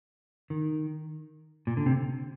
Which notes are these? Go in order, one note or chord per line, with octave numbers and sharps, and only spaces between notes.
D#3
A#2
D3
C3